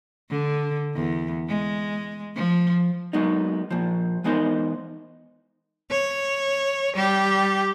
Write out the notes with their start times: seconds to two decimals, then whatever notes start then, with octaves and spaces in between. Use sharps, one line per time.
0.30 D3
0.95 E2
1.48 G#3
2.36 F3
3.13 F#3 G#3 A#3 B3 D#4
3.70 A#2 F3
4.24 E3 G#3 B3 D#4 A#4 C5
5.90 C#5
6.95 G3 G4